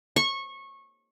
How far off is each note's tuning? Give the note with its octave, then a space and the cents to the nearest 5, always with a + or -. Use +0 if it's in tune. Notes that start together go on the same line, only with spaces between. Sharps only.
C#6 -20